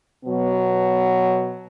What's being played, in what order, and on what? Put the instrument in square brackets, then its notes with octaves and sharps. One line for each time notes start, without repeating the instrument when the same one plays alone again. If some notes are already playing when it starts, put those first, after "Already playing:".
[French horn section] B2 F#3 B3